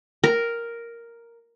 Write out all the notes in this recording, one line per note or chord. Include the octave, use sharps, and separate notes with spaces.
A#4